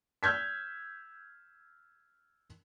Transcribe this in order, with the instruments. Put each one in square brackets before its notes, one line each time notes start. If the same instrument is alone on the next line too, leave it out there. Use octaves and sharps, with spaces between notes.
[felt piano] E6 F6 G6 G#6 B6